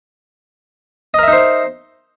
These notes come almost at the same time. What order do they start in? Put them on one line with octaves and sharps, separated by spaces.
D#5 A#4 E5 D#4 C5